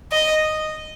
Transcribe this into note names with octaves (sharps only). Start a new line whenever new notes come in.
D#5